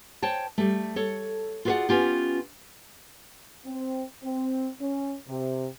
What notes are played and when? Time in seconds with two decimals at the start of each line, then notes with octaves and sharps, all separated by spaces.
0.22 C5 C#5 G5 A5
0.58 G3 A3
0.96 A4 C#5
1.65 F4 F#4 G#4 B4 D5 F#5
1.89 B3 C#4 F4 G4
3.66 C4
4.24 C4
4.80 C#4
5.28 C3